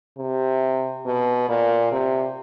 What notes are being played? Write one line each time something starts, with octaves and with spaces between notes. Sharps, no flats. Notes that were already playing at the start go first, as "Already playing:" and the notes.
C3
B2
A#2
C3